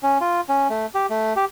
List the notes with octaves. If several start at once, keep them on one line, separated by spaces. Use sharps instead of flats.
C#4
F4
C#4
A3
G4
A3
G4